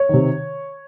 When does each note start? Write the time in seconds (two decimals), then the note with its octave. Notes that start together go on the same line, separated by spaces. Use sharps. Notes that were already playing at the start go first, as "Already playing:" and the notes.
Already playing: C#5
0.09 C3 D#3